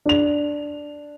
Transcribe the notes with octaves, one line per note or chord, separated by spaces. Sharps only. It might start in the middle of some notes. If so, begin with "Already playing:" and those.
D4 F7